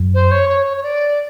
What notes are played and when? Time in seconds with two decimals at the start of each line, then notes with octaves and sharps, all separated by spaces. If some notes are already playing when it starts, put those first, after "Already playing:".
Already playing: F#2
0.14 C5
0.31 C#5
0.49 C#5
0.66 C#5
0.77 C#5
0.83 D5